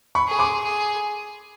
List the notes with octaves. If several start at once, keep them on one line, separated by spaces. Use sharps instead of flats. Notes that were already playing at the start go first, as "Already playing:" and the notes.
B5 C#6
G#4
C6 D6
G#4